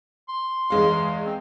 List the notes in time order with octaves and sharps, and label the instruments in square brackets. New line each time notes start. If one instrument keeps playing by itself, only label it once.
[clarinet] C6
[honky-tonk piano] E2 G#3 F5
[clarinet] C4